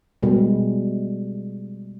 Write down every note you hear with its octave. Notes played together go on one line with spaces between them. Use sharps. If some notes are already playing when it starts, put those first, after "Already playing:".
B2 G3 G#3